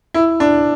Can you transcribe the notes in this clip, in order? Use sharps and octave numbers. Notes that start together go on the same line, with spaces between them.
E4
D4